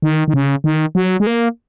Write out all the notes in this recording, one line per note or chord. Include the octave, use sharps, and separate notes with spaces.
D#3
D#3
C#3
D#3
F#3
G#3
A#3